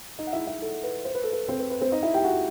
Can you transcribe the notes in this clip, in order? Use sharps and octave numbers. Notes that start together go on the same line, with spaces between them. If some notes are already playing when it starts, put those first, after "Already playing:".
D#4 D#5
F#5
E4 E5
E4 E5
A4
B4
C5
B4
A4
B4
C4 C5
B4
B4
C4 C5
D#4 D#5
E4 E5
G4 G5
F#4 F#5